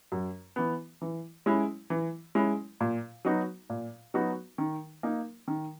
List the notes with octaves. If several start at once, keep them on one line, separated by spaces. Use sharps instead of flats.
F#2
E3 B3
E3
G#3 C#4 E4
E3
G#3 C#4 E4
A#2
F#3 B3 D#4 F#4
A#2
F#3 B3 D#4 F#4
D#3
A#3 D#4
D#3